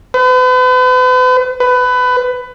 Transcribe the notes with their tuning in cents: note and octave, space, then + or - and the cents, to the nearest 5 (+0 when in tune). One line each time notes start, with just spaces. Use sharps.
B4 +40
B4 +20